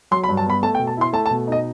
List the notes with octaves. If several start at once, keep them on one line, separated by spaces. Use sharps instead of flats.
F#3 C6
B5
G2
A5
B3 B5
A3 A5
G5
B2
A5
E4 C6
A3 A5
A5
B2
D#4 D#5